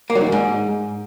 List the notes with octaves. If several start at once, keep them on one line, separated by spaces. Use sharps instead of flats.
A#3
F#3
D#3
F#2
G#2